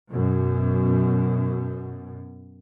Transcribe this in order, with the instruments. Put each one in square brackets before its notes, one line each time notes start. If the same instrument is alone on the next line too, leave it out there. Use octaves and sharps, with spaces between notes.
[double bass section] F#2 B2